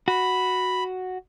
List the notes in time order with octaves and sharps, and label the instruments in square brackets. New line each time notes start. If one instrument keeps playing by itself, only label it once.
[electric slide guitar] F#4 [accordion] B5